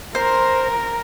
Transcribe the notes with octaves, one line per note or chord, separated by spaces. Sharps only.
A#4 C5